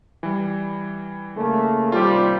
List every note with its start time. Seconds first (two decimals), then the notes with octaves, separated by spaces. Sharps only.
0.23 E3 G3
1.35 C#3 A3 A#3
1.92 D#2 C3 G3 F4 G4